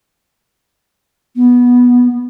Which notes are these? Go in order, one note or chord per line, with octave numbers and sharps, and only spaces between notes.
B3